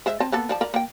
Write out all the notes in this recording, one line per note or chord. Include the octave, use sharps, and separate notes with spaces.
G#3 C5 E5
C4 A5
A#3 B3 A4
F3 D5 A5
A#4 D5 A#5
A#3 G5